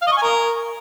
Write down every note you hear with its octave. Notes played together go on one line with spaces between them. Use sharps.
F5
D#5
C#6
G#5
A#4